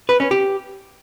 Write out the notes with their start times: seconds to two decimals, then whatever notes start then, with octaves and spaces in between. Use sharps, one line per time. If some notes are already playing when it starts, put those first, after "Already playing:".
0.09 B4
0.20 C#4
0.31 G4